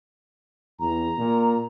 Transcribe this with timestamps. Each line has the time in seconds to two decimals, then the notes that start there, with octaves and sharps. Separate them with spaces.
0.80 E2 A#5
1.18 A#2